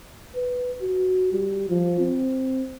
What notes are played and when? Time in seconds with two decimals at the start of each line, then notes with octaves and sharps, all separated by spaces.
0.35 B4
0.82 F#4
1.32 G3
1.69 F3
2.00 C4